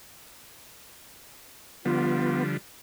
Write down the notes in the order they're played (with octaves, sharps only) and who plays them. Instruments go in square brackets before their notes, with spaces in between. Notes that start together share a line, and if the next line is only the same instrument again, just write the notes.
[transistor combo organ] D3 F3 G3 [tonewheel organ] B3 [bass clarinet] F4